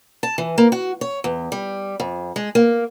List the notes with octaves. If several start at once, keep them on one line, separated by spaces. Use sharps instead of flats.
A5
E3
A#3
F#4
C#5
E2
G3
F2
G#3
A#3